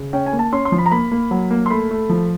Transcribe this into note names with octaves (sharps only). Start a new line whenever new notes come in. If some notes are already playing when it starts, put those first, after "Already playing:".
Already playing: C#3
C#4 G5
G#5
A#3
A5
C#4 C6
C6
F3
B5
A#5
A#3 B5
A#3
F#3
A#3
C6
A3 B5
A3
F3